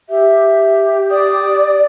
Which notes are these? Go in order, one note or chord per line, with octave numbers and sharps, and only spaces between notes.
G4 E5
D5 D#6